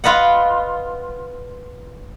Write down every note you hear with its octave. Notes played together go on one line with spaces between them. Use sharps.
F4 B4 D#5 F#5